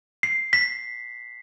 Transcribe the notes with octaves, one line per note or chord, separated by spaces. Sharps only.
C7
B6